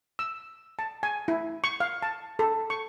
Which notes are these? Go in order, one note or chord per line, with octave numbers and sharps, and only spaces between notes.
E6
A5
G#5
E4
C#6
F5
A5
A4
C#6